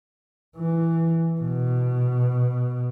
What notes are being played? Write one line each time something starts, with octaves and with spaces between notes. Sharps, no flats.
E3
B2